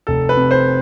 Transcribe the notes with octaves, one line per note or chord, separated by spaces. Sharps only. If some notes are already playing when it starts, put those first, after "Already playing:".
F1 A4
B4
C3
C5